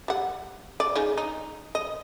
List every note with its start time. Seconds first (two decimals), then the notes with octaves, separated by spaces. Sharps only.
0.08 G3 F#5
0.80 D5
0.96 C#3 D#4 D5
1.17 D#4
1.75 D#5